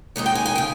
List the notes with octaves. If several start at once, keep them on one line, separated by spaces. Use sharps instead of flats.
D#2 D#3 G#3 D#4
G5
G#5
G#5
C#3 G5